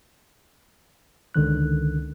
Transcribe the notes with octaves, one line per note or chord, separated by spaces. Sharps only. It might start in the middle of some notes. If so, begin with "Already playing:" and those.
C#2 D3 D#3 F#6